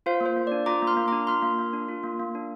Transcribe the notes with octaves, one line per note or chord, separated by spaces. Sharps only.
F4 C5 F5
A#3
C5
A#3
D4 D5
F4 A#5 D6
A#3
C6 F6
A#3
D4 A#5 D6
F4 C6 F6
A#3
A#3
D4
F4
A#3
A#3
D4